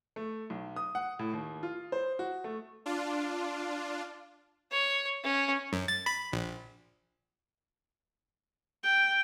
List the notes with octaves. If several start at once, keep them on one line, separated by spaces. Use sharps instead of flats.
A3
B1
D#6
F#5
A2
D#2
F4
C5
F#4
A3
D4 F4
C#5
C#4
F#2
A6
B5
A#1
G5